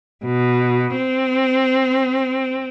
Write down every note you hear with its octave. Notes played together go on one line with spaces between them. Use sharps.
B2
C4